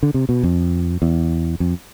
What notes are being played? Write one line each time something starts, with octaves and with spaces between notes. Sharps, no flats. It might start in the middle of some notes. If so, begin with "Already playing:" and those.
D3
C3
B2
F2
E2
F2